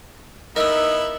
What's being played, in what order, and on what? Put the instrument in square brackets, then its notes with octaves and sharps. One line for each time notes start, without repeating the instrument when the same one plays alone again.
[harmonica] B3 E4 [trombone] D#4 [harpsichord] A#4 [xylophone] D#5 E6